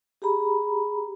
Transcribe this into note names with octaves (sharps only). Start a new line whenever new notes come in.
G4 G#4 A#5 B5